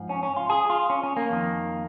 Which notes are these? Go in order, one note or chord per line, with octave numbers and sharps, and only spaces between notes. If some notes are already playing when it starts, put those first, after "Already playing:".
Already playing: G#2 F3
C#4
C#4
F4
G#4
F4
C#4
C#4
A#3
F2 D#3